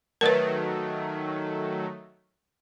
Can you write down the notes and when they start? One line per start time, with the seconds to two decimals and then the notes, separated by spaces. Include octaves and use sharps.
0.21 D#3 F#3 A3 A#4 B4